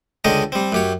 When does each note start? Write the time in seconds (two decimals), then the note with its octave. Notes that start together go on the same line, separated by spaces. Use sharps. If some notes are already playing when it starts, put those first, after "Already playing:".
0.24 C#2 D3 C#4 A4 D#5 G5
0.52 G3 C4
0.72 F#2 G4 C#5